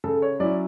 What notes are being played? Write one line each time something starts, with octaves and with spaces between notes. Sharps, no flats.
C#3 A4
C#5
F#3 C#4 E4 D5